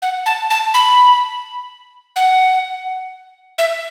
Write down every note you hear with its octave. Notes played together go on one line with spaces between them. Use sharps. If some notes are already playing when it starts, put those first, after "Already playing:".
F#5
A5
A5
B5
F#5
E5